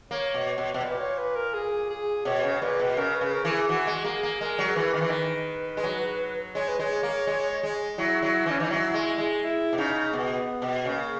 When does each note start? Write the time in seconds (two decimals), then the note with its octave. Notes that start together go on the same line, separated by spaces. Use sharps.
0.11 A#3 C#5
0.34 B2
0.58 B2
0.74 B2
0.82 A#2 B4
1.00 C#5
1.18 B4
1.36 A#4
1.54 G#4
1.90 G#4
2.25 B2 C#5
2.44 C#3
2.61 A#2 B4
2.79 B2
2.97 C#3 A#4
3.15 B4
3.21 C#3
3.33 A#4
3.45 E3
3.51 G#4
3.69 E3 F#4
3.87 G#3
4.04 A#3 G#4
4.23 A#3
4.41 G#3 A#4
4.58 F#3
4.76 E3 B4
4.94 D#3
5.01 E3
5.09 D#3 B4
5.77 G#3
5.84 F#3
6.55 G#3 C#5
6.69 B4
6.79 G#3 C#5
7.03 A#3
7.27 G#3
7.63 G#3
7.98 F#3 E4
8.22 F#3
8.46 E3 C#4
8.60 E3 D#4
8.70 F#3 E4
8.94 G#3
9.18 G#3
9.42 E4
9.73 B2
9.78 C#3 D#4
10.13 B2 B3
10.62 B2
10.85 C#3 A#3